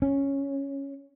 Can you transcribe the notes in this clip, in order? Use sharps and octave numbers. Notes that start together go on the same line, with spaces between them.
C#4